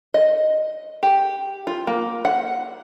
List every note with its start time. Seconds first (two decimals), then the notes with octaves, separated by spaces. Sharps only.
0.14 D#5
1.03 G4
1.67 F4
1.87 A#3
2.25 F#5